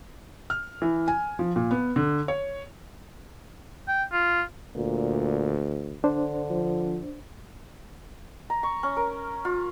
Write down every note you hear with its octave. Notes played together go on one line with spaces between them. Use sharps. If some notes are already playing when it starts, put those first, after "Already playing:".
F6
E3
G#5
F3
A#2
B3
D3
C#5
G5
F4
D2 A#2
D3 D4 C5
F3
A#5
C#6
C#4
A#4
F4